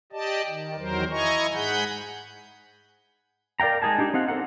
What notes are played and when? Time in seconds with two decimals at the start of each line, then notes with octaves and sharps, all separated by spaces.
0.12 G4 D5 D#5 A5
0.46 D#3
0.78 E2 D#3 F#3 A#4 C5
1.11 E4 D#5 G#5 A#5 C#6
1.54 G#2 G#4 F#5 B5 G6
3.60 A#4 D5 F5 G5 A#5
3.82 G#3 D#4 G#4 G#5 A5
3.98 D4 D#4 G4
4.14 C4 D#4 F5 F#5
4.28 C4 A4 A#4 F#5